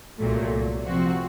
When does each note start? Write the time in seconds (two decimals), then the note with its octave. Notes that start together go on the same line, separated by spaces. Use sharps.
0.17 C2 A#2 F#3 A3
0.85 C3 F3 C4 F#4